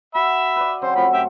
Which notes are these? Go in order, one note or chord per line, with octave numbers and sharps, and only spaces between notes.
F#4 E5 B5
B4 D5
C#3 F#3 C4 C5
F3 A3 C4 B5
F#2 G4 E5